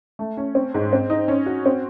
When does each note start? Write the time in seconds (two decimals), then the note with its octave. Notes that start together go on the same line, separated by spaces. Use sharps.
0.19 A3
0.37 C#4
0.55 C4
0.74 G#2
0.93 C4
1.10 D#4
1.28 C#4
1.46 F#4
1.66 C4